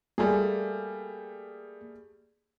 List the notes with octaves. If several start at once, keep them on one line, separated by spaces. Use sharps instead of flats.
G3 A3 A#3 G#4